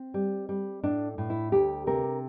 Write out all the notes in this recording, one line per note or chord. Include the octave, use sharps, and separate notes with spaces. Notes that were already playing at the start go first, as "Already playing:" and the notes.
Already playing: C4
G3
G3
A2 D4
A2
E4
D2 G4
C3 A#4